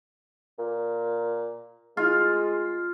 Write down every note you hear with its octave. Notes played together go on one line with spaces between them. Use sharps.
A#2
G#3 F4